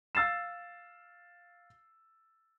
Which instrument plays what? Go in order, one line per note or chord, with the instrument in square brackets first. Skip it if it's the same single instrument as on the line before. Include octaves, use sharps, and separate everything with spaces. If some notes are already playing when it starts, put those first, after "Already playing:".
[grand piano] F5 E6 A6 C7 E7